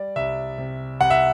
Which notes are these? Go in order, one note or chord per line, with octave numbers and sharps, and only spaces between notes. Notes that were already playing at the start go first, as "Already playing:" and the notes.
Already playing: G3 D5
C2 E5
C3
C2 F#5
E5